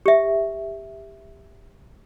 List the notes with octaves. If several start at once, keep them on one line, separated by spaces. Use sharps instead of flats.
G4 E5